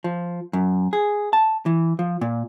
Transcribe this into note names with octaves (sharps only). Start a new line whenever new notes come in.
F3
F#2
G#4
A5
E3
F3
A#2